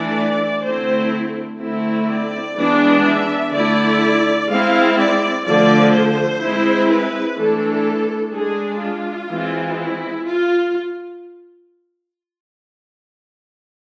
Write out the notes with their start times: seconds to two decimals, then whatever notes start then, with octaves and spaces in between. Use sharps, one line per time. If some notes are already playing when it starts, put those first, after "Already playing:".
Already playing: E3 A3 D4 D5
0.63 D3 A3 C4 E4 C5
1.59 D3 A3 C4 E4
2.08 D5
2.56 E3 G#3 B3 D4
3.04 E5
3.52 D3 A3 E4 D5
4.48 G#3 C4 E4 F5
4.97 D5
5.45 D3 F3 A3 D5
5.93 C5
6.41 G#3 C4 E4
6.89 B4
7.37 E3 A3 D4 A4
8.34 G#3 D4 G#4
8.81 F4
9.29 E3 G#3 C4 E4
9.78 E4
10.26 F4